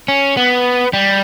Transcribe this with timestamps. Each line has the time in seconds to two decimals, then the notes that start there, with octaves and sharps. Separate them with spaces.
0.08 C#4
0.37 B3
0.93 G3